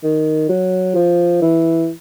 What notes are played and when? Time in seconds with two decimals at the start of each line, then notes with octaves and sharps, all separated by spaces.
0.03 D#3
0.49 F#3
0.95 F3
1.42 E3